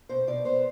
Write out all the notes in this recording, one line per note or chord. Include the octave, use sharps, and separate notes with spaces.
B2 C5
B2 D5
B3 C5